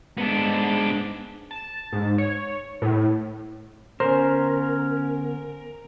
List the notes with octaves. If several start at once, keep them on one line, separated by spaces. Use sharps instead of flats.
G#2 G#3 B3 D4
A5
G#2
C#5
A2
D3 B3 C#4 A#4 C5